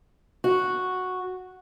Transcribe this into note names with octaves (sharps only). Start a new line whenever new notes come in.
F#4